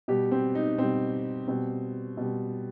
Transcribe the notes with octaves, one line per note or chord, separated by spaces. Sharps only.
B2 G3 G4
C4
D#4
B2 G3 C4
B2 G3 C4
B2 G3